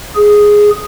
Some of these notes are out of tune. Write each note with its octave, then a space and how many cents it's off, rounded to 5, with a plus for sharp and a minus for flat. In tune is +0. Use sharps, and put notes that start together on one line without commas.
G#4 +0